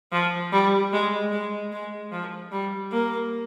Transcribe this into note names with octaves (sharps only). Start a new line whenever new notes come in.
F3
G3
G#3
G#3
G#3
F3
G3
A#3